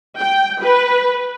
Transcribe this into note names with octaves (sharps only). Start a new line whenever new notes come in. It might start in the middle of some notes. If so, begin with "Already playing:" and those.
G5
B4